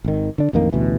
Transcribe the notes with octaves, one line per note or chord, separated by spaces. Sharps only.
G#1 D#3
D3 D4
A1 F2 D#3 A#3
A1 D2 B2 E3